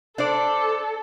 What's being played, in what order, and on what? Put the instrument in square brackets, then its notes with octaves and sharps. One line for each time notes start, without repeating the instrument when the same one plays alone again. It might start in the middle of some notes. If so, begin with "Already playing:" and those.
[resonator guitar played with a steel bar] D4 C5 D5 [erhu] A4